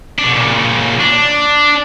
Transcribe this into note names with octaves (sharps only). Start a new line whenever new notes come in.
B2 D4
A#2 C#3
D4